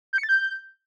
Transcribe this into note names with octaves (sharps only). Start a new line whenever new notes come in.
G6
C#7
A6
G6